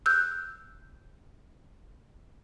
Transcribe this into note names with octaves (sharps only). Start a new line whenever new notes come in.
E6 F#6 G6